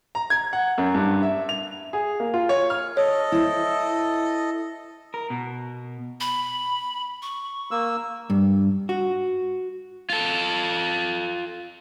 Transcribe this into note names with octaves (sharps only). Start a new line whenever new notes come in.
A#5
G#6
F#5
F#2
G2
E5
F7
G#4
A#3
F4
C#5
F6
A4 C#5 D#5
E4 C5
A#4
B2
B5
C#6
A#3 E6
G2
F#4
F4 A4